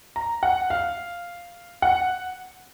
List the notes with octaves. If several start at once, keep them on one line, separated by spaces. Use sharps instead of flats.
A#5
F#5
F5
F#5